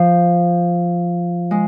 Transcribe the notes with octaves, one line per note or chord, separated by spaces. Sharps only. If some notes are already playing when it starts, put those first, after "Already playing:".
Already playing: F3
G#3